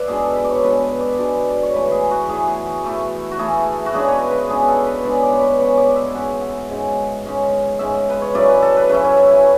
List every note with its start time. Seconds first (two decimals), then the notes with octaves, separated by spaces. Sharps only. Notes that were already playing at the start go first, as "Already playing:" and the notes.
Already playing: B4 D5 E5
0.08 B2 G#3 B3 D4 G#4
0.23 A4
0.36 B4
0.44 D5
0.50 C#5
0.64 B2 G#3 B3 D4 B4
0.82 B4
1.01 D5
1.18 B2 G#3 B3 D4 D5
1.50 D5
1.63 C#5
1.74 E3 A3 E4 B4
1.92 G#4
2.11 F#4
2.29 E3 A3 E4 G#4
2.47 G#4
2.66 F#4
2.84 E3 A3 E4
3.31 F#4
3.39 E3 A3 E4 G#4
3.86 F#4
3.94 C#3 G#3 B3 D4 G#4
4.08 B4 C#5
4.31 B4
4.49 C#3 G#3 B3 D4 G#4
4.68 A4
4.86 B4
5.04 C#3 G#3 B3 D4 D5
5.23 D5
5.32 C#5
5.41 B4
5.59 C#3 G#3 B3 D4 C#5
5.77 D5
5.96 E5
6.08 G#5
6.15 G#2 G#3 C#4 F#5
6.42 F#5
6.70 G#2 G#3 C#4
7.25 G#2 G#3 C#4
7.79 G#2 G#3 C#4 E5
8.09 B4
8.22 C#5
8.34 C#3 F#3 C#4 E4 D5
8.48 B4
8.62 A4
8.77 B4
8.89 C#3 F#3 C#4 E4 B4
9.04 C#5
9.17 E5
9.31 G#5